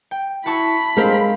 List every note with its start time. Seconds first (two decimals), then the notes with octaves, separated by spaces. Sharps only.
0.11 G5
0.46 E4 F#4 A5 B5 C#6
0.97 G2 G#3 C4 A#4 C5 F5